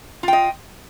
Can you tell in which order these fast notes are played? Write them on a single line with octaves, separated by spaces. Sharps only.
F4 G5 D#5